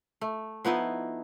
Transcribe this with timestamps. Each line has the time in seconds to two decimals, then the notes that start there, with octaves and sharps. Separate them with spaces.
0.21 A3
0.65 F3 B3 D#4 E4